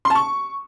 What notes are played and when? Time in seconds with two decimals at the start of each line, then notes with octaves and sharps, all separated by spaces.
0.05 C6
0.10 A5
0.15 C#6